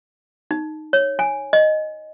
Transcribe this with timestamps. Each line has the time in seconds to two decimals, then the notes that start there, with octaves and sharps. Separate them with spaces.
0.51 D#4
0.93 C#5
1.19 G#5
1.53 D#5